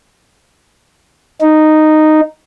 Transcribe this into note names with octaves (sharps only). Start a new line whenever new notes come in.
D#4